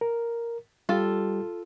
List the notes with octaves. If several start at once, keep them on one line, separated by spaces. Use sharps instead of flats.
A#4
G3 F4 G4 A4